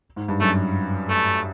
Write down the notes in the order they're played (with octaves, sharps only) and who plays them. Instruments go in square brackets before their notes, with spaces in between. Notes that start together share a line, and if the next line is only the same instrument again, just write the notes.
[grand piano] G#2
G2
[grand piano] F#2 [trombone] A3
[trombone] A3